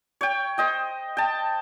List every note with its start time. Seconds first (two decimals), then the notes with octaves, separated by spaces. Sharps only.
0.21 C#5 G5
0.58 C5 D#5 G5
1.17 G5 A5